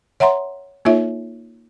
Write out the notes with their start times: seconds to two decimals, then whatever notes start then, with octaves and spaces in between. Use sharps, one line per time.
0.20 C#5 E5 F#5 A#5 C6
0.85 A#3 D#4 F4 A4 C#5 E5